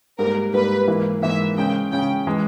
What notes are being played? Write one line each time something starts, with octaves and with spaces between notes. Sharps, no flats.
G#2 G3 A#3 A#4
G#2 G3 A#3 B4
G#2 E3 A#3 E4
G#2 E3 A#3 E4 E5
C#3 G#3 C#4 G5
C#3 G#3 C#4 G5
E3 G#3